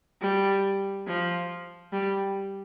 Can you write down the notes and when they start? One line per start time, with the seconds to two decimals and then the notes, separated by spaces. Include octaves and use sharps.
0.22 G3
1.08 F3
1.93 G3